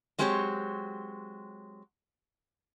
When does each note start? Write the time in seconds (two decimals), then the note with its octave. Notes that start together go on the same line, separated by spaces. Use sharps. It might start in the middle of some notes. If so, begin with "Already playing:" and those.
0.19 F#3 G#3 C4 G4 C5 C#5